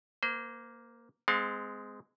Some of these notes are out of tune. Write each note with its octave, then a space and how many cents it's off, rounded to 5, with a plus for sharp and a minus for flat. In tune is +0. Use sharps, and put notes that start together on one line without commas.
A#3 +0 C5 -30
G#3 +0 C4 -30 F5 +35